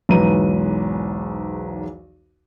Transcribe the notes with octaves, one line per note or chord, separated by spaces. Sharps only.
B1 E2 G#2 B4 A#5 D#7